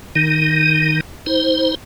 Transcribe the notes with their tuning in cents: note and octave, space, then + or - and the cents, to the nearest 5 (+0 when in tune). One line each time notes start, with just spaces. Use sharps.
D#3 +0 D#4 +0
D#4 +45 C5 +0